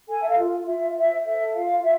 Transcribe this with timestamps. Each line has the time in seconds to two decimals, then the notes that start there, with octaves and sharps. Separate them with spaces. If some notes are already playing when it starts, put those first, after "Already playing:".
0.08 A4 G#5
0.23 E5
0.28 F5
0.38 F4
0.67 F4 E5
0.96 C5 E5
1.24 A4 E5
1.54 F4 F5
1.83 F4 E5